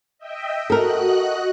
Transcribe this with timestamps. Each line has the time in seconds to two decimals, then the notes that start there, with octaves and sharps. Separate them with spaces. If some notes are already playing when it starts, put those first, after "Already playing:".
0.18 D#5 E5 G5
0.70 F#4 A4 A#4 D#5 F#6